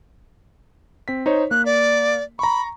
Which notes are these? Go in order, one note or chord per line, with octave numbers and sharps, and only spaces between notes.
C4 B6
D#4 C5 C#5
A#3 F#6
D5
A#5 B5 C#6